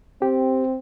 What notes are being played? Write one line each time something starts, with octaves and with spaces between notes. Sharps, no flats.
C4 G4